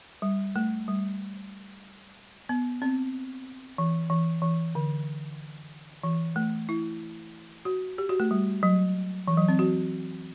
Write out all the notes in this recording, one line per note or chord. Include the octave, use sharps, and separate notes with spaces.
G3
A3
G3
B3
C4
E3
E3
E3
D3
E3
A3
E4
F#4
G4
F#4
A3
G3
F#3
E3
F#3
C4
F#4